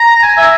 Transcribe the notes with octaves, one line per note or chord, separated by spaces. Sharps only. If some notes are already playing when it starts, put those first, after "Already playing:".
Already playing: A#5
G#5
E5